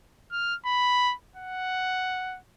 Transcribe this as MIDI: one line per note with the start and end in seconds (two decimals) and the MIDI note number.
0.32 0.55 89
0.66 1.14 83
1.36 2.37 78